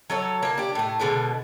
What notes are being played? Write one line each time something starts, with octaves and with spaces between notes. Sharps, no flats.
F#3 A4 C#5
A#3 A5
D4 G4
A2 A3
B2 D3 G#3 B3